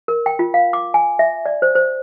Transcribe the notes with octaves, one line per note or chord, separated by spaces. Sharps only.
A#4
G5
F4
F5
D6
G#5
E5
D5
C5
C5